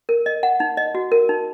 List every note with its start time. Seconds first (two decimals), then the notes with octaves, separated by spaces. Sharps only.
0.09 A#4
0.26 D#5
0.43 F#5
0.60 D#4
0.77 D#5
0.95 F#4
1.12 A#4
1.29 D#4